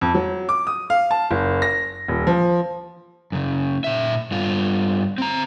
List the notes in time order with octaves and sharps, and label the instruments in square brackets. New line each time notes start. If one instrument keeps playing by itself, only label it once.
[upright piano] F2
F#3
D6
D#6
F5
A5
F#1
A#6
D#1
F3
[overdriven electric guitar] F#2 C#3
A#2 E5
G2 F4
C4 A#5